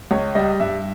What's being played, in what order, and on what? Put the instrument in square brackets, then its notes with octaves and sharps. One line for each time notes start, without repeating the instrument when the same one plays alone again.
[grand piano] C#2 C#5
G3 D#5
G2 E5